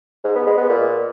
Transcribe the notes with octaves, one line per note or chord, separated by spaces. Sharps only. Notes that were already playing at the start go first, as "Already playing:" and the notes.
G#2
B3
G#3
B3
A#2